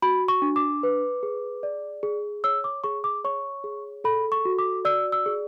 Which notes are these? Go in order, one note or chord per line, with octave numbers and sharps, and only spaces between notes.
F#4 B5
C#6
D4
D6
B4
G#4
D5
G#4
C#5 E6
D6
G#4 C#6
D6
C#5 C#6
G#4
A4 B5
C#6
F#4
D6
D5 E6
E6
G#4